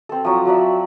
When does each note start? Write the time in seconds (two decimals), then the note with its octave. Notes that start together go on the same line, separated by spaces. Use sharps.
0.09 C4 A4
0.25 F3 F#3 F#4
0.46 F3 F#3 D5 E5